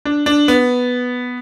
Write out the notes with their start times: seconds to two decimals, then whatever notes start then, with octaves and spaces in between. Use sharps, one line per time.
0.05 D4
0.26 D4
0.48 B3